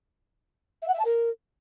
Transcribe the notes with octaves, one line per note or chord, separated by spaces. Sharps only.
E5
F#5
E5
A5
A#4